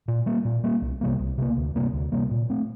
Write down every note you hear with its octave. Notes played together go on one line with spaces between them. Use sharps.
A#2
G3 A#3
A#2
G3 A#3
C2
C3 G3 A#3
C2
C3 G3 A#3
D2
C3 G3 A#3
D2
C3 G3 A#3
A#2
A3 C4